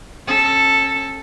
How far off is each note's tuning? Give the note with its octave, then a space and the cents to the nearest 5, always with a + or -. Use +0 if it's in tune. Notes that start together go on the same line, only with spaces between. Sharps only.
C#4 -30 A4 +0